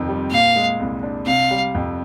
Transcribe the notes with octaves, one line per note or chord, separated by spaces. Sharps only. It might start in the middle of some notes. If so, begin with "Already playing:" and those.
Already playing: F2 C3 D#3
G3
A#2 F5
G#3
C2
D4
C3 F5
G3
F2